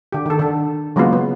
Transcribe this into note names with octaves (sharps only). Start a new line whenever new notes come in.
D3 G4
D#3 A4
D3 A4
C#3 F#3 G#3 A#3 B3 F4
B3